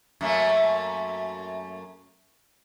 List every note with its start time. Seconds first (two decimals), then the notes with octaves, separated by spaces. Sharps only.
0.21 F#2 A3 A#3